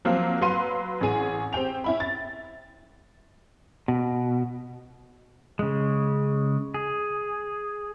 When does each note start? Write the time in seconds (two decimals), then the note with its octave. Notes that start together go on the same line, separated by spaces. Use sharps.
0.05 F3 F#3 A#3 C4 F4
0.42 F#3 B4 F5 C6 D#7
1.01 A1 C#4 G#4 D#7
1.53 C4 G4 G5 F7
1.84 C#4 E4 B5
2.00 A6
3.88 B2
5.59 C#3 G#3
6.74 G#4